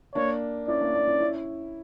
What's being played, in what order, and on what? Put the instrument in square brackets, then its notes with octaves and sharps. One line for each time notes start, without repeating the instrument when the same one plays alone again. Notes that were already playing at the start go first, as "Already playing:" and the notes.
[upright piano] A#3 D4 [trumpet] C#5
[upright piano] C#4 E4 [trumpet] D5
[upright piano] A#3 D4
A#3 D4
C#4 E4
C#4 E4